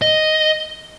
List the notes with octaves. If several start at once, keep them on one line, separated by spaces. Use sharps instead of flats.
D#5